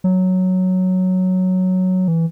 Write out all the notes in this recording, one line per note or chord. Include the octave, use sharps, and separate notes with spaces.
F#3
E3